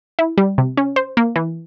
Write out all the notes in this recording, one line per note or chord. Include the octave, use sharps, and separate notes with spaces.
E4
G3
C3
C#4
C5
A#3
E3